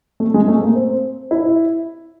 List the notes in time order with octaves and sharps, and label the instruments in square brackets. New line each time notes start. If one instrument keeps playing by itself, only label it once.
[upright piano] A3
G#3
A3
A#3
C4
E4